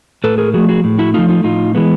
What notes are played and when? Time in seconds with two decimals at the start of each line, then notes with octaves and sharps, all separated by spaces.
0.24 A2 A4 B4
0.38 G#4 A#4
0.54 F3 A3 F#4 G#4
0.69 F#4 G#4
0.84 A2
0.99 E4 F#4
1.14 F3 A3 D#4 F4
1.29 D#4 F4
1.44 A2 D#4 F4
1.75 E3 G#3 B3